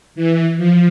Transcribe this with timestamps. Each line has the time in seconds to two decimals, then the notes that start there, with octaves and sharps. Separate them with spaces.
0.16 E3
0.57 F3